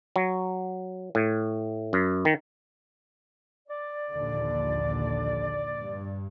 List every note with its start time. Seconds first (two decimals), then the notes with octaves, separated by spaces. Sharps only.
0.16 F#3
1.15 A2
1.93 F#2
2.25 D#3
3.68 D5
4.12 A#1 D#2 D3
5.76 G2